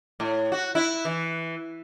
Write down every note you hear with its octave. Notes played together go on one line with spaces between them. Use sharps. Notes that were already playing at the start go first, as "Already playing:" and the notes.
A2
F#4
E4
E3